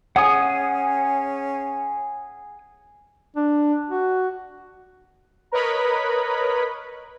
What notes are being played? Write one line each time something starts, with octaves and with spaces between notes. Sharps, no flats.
C#4 G#4 F#5 D#6
D4
F#4
A#4 B4 C#5 D#5 B5